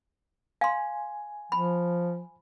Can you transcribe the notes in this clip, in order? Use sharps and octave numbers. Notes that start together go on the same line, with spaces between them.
F5 G#5 C6
F3 B5